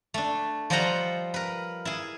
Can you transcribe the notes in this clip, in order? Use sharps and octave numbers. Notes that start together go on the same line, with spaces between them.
A3 D4
F3 G3 C5 D#5 F#5 A#5
A#4 B4
E4 G#4